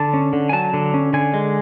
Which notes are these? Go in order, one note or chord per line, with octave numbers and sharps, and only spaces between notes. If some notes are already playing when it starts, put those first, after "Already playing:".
Already playing: D3 A5
C#4
D3
G#5
F#3 A5
D3
C#4
D3 G#5
G#3